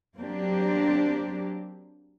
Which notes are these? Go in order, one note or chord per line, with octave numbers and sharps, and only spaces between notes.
F#3 A#3 C4 D4 G4